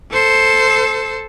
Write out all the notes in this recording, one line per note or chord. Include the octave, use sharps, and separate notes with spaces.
A4 C5